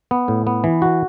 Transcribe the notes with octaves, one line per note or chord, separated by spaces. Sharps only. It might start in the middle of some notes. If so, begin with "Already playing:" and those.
B3
A2
B3
E3
F#4